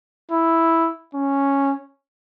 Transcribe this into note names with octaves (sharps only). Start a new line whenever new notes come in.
E4
C#4